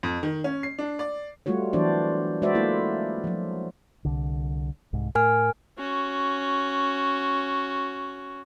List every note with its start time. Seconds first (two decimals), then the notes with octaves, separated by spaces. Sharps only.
0.03 F2
0.23 D#3
0.44 C#4
0.63 C7
0.79 D4
0.99 D5
1.46 G3 A3 F4 F#4 C#5
1.73 E3 F#3 B3 D4 C5 D5
2.42 G#3 F#4 B4 C5 D5 E5
2.55 A3 A#3 E4 F4 A4
3.24 F3 F#3
4.05 C2 D3
4.93 C2 G#2
5.15 A2 A#4 G#5 F6
5.79 C#4 F#4